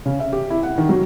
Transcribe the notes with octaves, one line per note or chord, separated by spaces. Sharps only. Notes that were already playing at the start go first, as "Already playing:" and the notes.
C#3
E5
G4
E4
F#5
D#3
F#3